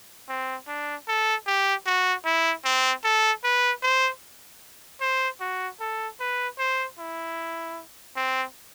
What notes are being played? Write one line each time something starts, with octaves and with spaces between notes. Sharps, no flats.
C4
D4
A4
G4
F#4
E4
C4
A4
B4
C5
C5
F#4
A4
B4
C5
E4
C4